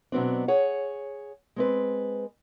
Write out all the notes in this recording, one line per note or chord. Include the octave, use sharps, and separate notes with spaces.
B2 F#3 B3 C4 D4
G#4 C#5 F#5
G#3 C4 B4